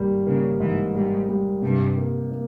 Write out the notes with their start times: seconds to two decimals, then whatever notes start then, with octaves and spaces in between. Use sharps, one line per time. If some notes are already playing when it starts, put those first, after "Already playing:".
Already playing: G#1 G3 A#3
0.27 C#3 A#3
0.60 G#2 E3
0.95 G#2 G3
1.29 G3
1.62 G2 C3
1.97 A#3
2.32 A#3